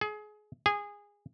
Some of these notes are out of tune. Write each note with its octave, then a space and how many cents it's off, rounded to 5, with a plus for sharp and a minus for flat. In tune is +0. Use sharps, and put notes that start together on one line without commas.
G#4 +25
G#4 -20